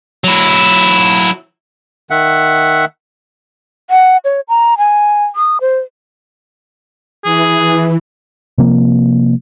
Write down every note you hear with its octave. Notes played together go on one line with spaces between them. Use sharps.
F#3 E4
D#3 E5 F#5
F#5
C#5
A#5
G#5
D#6
C5
E3 G#4
C3 F3 A#3